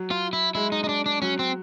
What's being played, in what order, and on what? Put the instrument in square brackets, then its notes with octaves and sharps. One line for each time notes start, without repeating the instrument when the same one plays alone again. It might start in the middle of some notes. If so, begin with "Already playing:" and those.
Already playing: [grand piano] F#3
[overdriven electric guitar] F4
E4
[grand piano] G#3 [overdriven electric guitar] E4
[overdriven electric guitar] D#4
D#4
D4
D4
[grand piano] F#3 [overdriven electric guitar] C#4
[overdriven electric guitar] C4